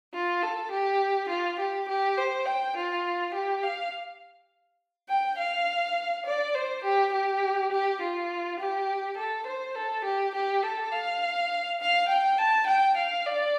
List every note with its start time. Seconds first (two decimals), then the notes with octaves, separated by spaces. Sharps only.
0.14 F4
0.43 A4
0.71 G4
1.29 F4
1.59 G4
1.89 G4
2.17 C5
2.46 G5
2.76 F4
3.34 G4
3.63 F5
5.09 G5
5.38 F5
6.26 D5
6.55 C5
6.84 G4
7.13 G4
7.72 G4
8.01 F4
8.60 G4
9.17 A4
9.47 C5
9.76 A4
10.04 G4
10.35 G4
10.63 A4
10.92 F5
11.81 F5
12.09 G5
12.38 A5
12.67 G5
12.97 F5
13.26 D5